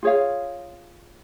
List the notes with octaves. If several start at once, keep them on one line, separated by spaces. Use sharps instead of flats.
F4 G#4 C#5 F5